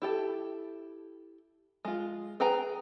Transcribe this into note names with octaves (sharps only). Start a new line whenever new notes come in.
E4 G4 A4
G#3 F4
G#4 B4 G5 G#5 A#5